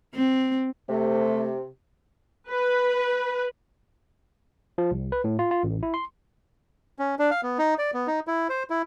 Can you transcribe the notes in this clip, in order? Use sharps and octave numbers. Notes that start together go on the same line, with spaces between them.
C4
C3 A3
B4
F3
C2
B4
A2
F4
F4
A1
E4
C6
C#4
D4
F5
B3
D#4
D5
B3
D#4
E4
C5
E4